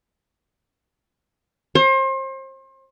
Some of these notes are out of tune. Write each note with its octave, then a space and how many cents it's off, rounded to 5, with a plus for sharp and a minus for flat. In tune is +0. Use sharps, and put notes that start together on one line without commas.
C5 +35